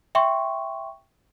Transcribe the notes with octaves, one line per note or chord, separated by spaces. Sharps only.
E5 G5 C6 C#6